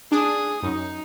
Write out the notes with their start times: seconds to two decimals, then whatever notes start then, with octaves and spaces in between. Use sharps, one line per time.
0.12 D4 G#4 D#6
0.63 F#2 D#4